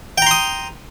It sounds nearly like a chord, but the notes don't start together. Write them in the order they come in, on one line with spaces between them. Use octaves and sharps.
G5 A#5 C6 D#6